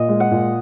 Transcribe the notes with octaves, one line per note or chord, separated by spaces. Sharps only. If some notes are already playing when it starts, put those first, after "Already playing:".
Already playing: A#2 D#5
G#3
F#5
A#2